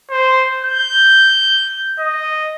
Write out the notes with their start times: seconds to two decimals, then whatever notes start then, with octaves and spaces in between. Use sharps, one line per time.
0.10 C5
0.65 G6
1.99 D#5